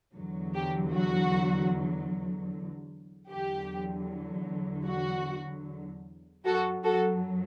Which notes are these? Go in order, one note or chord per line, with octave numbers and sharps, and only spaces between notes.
E2 D3 F#3
G4
F#4
E2 D3 F#3 G4
F#4
F#2 F#3 F#4 A4
F#4 A4